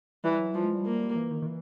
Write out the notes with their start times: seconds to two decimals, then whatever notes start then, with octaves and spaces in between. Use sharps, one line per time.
0.24 E3 G3
0.39 F#3
0.54 F3 G3
0.64 G#3
0.75 G3
0.86 A#3
1.16 E3
1.31 D#3
1.42 D#3
1.46 E3